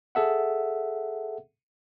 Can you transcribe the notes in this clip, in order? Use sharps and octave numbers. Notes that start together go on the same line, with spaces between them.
G#4 A4 E5 F#5